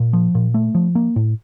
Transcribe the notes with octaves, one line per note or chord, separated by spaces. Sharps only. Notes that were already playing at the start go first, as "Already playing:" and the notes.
Already playing: A#2
F3
A#2
A3
F3
A#3
A2